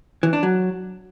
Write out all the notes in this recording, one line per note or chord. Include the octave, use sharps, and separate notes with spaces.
E3
D4
F#3